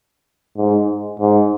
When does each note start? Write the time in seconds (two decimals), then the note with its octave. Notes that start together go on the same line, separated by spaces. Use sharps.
0.57 G#2
1.20 G#2